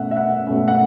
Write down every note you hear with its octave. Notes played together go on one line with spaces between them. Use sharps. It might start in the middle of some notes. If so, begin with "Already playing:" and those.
Already playing: B2 A3 C#4 E5 F#5
E5
F#5
B2 A3 C#4
F#5